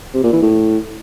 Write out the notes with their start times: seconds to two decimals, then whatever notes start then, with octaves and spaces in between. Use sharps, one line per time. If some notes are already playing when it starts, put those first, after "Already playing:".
0.14 C3
0.23 A#2
0.33 E3
0.42 A2